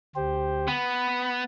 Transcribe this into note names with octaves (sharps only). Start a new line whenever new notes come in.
D2 G4 C5
B3 B5